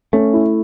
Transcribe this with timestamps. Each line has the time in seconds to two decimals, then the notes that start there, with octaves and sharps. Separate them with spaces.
0.13 A3 C#4
0.33 E4